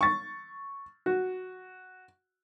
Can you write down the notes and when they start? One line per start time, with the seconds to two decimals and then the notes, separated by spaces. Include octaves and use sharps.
0.01 C#6 A6
1.06 F#4